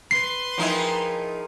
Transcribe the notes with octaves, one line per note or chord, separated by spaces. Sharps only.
B4 C6 C7
F3 D#4 E4 G#4 A#4 G5